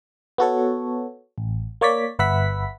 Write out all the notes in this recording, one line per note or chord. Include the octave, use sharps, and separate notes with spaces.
B3 F#4 A4 C#5
A1
A#3 C#5 D5 B6
G1 B4 E5 F#5 B5 B6